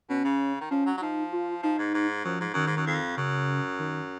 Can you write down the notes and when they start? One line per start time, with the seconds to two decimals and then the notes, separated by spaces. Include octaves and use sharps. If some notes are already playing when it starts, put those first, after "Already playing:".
0.09 B2 C#4
0.24 C#3
0.61 D#3
0.71 F3 C#4
0.86 F#3
0.98 F#3
1.01 F3 D#4
1.32 F4
1.63 F3 D#4
1.79 G#2
1.94 G#2
2.24 F#2 F3
2.41 G#2
2.54 F#2 D#3
2.67 G#2
2.77 F#2
2.87 F2
3.17 F#2 C#3
3.79 D#3